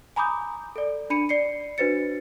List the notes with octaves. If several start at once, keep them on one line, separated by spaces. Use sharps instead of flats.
G#5 A#5 B5 D6 D#6 G6
A4 D5
D4 B5 C#7 D#7
D5 C7 C#7
D4 F#4 B4 C5 A6 C#7